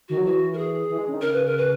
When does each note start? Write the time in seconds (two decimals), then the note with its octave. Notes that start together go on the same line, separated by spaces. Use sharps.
0.09 D#3 F#4
0.18 F#3
0.26 E3 F#4
0.53 A#4
0.58 G#4
0.90 E3
0.98 G#3
1.08 C#3
1.14 D#3
1.21 C#3 A#4
1.33 B4
1.46 A#4
1.58 B4